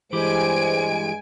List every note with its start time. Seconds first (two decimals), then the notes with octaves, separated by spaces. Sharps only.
0.13 G2 E3 G#3 E4 G4 C5 G#5 D7